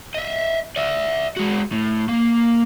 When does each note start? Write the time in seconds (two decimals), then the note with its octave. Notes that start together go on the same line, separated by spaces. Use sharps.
0.15 D#5 E5
0.76 D5 E5
1.36 G#3 F#4
1.72 A2
2.09 A#3